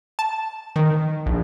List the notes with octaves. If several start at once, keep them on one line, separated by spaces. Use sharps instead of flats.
A5
D#3
A#1